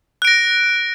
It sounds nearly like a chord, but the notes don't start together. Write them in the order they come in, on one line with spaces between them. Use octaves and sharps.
F#6 D7 A#6